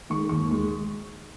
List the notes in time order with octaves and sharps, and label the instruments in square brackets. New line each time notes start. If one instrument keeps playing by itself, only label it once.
[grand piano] D#3 G#3 C#6
D#2 C#6
D#3 G#3